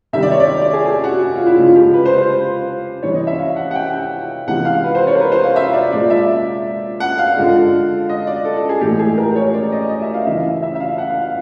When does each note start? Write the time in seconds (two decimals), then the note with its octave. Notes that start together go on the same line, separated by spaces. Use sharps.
0.13 C3 D#3 G3 E5
0.23 D5
0.32 C#5
0.40 D5
0.62 D5
0.73 G#4
0.86 G#4
1.04 F#4
1.36 F4
1.46 E4
1.58 C#3 F3 G#3 F4
1.76 G4
1.94 B4
2.05 C5
2.18 C5
3.03 C3 E3 G3 C#5
3.15 D#5
3.27 E5
3.39 F5
3.56 F#5
3.71 F#5
3.75 G5
3.93 G5
4.47 C3 E3 G#3 F#5
4.65 F5
4.84 B4
4.95 C5
5.07 C#5
5.15 A#4
5.20 B4
5.32 C5
5.43 F5
5.56 E5
5.73 D5
5.92 A#2 F3 G#3 D5
6.10 E5
7.00 F#5
7.18 F5
7.37 D3 F3 G#3
8.09 D#5
8.27 D5
8.45 A4
8.57 A4
8.69 G#4
8.81 A2 E3 G#3 G4
8.99 G#4
9.18 A#4
9.36 C#5
9.54 D5
9.72 D#5
9.81 D5
9.89 D#5
10.02 E5
10.14 F5
10.26 C#3 E3 G3 E5
10.38 E5
10.63 E5
10.75 E5
10.80 F5
10.98 F#5
11.10 F5
11.22 F5